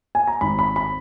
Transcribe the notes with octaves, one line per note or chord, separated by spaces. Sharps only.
G#5
A#5
G#1 B5
B5
B5